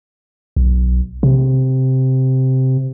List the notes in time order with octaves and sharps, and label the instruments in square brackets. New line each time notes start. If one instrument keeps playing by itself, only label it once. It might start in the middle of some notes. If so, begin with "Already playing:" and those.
[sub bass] B1
C3